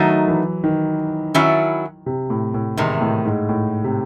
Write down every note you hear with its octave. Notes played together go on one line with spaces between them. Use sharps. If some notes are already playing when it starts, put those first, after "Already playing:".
Already playing: D#3 F#3 A3 D#4 F#4
E3
D#3
D#3 F#3 C#4 E4
C3
A2
A2
E2 G#2 C3 D#3
A2
G#2
A2
C3